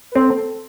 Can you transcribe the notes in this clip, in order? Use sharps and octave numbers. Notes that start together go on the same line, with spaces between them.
B4
C4 A4
A4